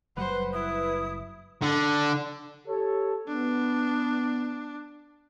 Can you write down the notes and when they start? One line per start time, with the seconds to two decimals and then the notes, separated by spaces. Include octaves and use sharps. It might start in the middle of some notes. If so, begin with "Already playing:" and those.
0.17 F#1 F#3 G3 B4 C5 F#5
0.53 E4 D#6
1.62 D3
2.68 G4 A4 C#5
3.28 B3 D4